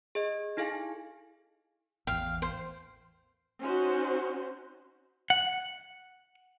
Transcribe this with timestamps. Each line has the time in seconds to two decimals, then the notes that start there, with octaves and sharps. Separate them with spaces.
0.15 G#4 D#5
0.57 D#4 E4 G#4 A4 F5 G#5
2.07 A1 E2 F5 G5
2.42 C5
3.62 C#4 D#4 F#4 C5
5.30 F#5